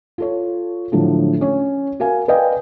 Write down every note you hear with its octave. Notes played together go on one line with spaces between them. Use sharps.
F4 A4 C#5
A2 D3 F3 F#3
C#4 C#5
F#4 A#4 F5 G#5
B4 D5 D#5 F5 G5 G#5